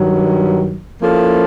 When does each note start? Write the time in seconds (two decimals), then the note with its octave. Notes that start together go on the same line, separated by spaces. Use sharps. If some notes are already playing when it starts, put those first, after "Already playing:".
Already playing: G2 D#3 F#3
1.02 F3 A#3 C#4 E4 A4